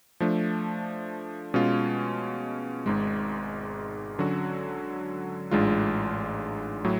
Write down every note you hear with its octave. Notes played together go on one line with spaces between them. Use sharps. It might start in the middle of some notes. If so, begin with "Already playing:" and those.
F3 A3 D4
B2 G#3 C#4 F4
G#1 G#2 G#3
D3 F#3 C#4 F#4
A1 G#2 G#3 D4 F4
A2 F#3